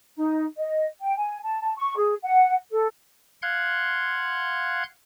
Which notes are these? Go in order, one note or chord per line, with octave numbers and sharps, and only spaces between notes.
D#4
D#5
G5
G#5
A5
A5
C#6
G#4
F#5
A4
F5 F#5 C6 F#6 G#6